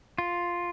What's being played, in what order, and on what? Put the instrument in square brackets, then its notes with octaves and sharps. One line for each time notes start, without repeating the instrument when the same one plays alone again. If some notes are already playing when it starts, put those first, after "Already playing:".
[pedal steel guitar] F4